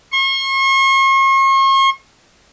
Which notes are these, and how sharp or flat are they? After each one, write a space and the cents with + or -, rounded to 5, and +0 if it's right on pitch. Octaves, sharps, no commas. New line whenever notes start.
C#6 -45